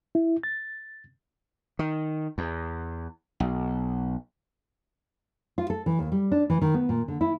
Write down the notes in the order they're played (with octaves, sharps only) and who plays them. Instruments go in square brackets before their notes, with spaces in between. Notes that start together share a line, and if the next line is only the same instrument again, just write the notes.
[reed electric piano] E4
A6
[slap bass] D#3
E2
B1
[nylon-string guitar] F4
A4
E3
D#2
G3
D4
E3
D#3
B3
A#2
D3
E4